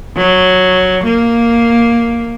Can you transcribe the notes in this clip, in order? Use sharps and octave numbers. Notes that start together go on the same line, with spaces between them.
F#3
A#3